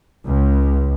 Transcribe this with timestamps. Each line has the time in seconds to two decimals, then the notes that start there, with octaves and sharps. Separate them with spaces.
0.24 C#2